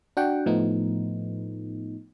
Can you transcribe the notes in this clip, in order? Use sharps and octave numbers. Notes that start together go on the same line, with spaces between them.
D4 F#4 F#5 G5
A2 F3 A3 B3 D#4